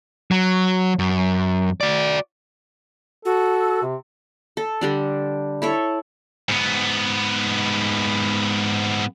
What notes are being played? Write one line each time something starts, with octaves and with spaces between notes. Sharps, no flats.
F#3
F#2
F#4 D5
F#4 A4
C3
A4
D3 G3 D4
E4 A4 C#5
G#2 B3